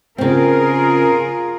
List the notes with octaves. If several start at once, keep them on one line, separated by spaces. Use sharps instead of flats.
C#3 C4 F4 G#4 A#4